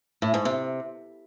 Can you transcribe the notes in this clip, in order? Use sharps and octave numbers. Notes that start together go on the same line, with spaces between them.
A2
G#2
C3